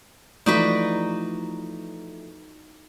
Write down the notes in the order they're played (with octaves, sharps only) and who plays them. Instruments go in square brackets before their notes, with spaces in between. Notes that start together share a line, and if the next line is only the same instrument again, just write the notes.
[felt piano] E3 F3 A3 [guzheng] D#4 F#4 B4 [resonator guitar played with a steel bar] D5